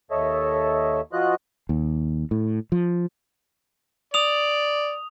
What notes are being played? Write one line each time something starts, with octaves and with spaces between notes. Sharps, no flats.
D#2 A4 C#5 D#5 E5
F3 F4 F#4 D#5 F#6
D#2
A2
F3
D5 D#6 F7